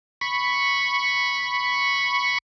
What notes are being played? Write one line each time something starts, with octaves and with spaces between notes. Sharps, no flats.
B5 C#6